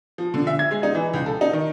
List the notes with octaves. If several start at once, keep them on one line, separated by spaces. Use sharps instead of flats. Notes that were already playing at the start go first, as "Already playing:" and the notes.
F3
D3
E5
G#6
G#3
D#4
E3
C#2
A4
D#4
D#3